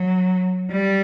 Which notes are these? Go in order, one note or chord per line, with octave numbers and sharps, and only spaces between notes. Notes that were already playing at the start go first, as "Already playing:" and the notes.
Already playing: F#3
G3